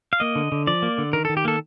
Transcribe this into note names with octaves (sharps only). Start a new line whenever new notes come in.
F5
A#3 D#5
D3
D3
F3 D5
A#3
D3
D#3 A#4
D#3 A4
G4
A#3 A4